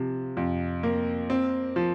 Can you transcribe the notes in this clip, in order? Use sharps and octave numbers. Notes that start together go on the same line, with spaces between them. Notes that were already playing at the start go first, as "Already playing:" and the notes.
Already playing: C3 F3
F2
A#3
C4
F3